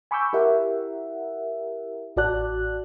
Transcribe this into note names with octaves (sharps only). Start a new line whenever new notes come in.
G#5 B5 C#6 D6 E6 G6
E4 G4 A#4 E5 F#5
A1 F#4 D5 A5 F#6